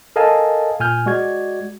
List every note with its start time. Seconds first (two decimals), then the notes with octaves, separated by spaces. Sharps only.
0.16 A4 A#4 D#5 F5 G#5 A5
0.80 A#2 G#5 F6 G6
1.06 G#3 F#4 D5 G#6